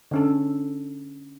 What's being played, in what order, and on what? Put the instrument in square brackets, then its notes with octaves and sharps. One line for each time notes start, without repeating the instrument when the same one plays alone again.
[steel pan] D3 C#4 A4